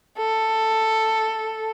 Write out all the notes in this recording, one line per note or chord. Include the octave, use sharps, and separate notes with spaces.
A4